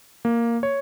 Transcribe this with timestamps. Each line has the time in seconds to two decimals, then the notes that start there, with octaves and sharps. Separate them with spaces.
0.25 A#3
0.63 C#5